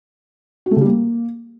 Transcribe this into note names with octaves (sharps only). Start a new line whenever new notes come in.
F#4
A3
C#3
G3
A#3